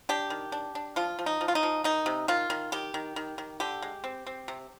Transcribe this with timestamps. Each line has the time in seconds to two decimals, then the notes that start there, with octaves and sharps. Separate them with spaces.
0.09 D4 G4
0.30 D#3
0.52 D4
0.75 D4
0.96 F3 F4
1.19 F3
1.26 D#4
1.41 F3
1.48 F4
1.55 D#4
1.63 F3
1.84 D#3 D#4
2.06 C3
2.28 D#3 F4
2.50 D#3
2.72 D#3 G4
2.94 D#3
3.16 D#3
3.38 D#3
3.60 D3 G4
3.82 G#3
4.04 C4
4.26 C4
4.48 C3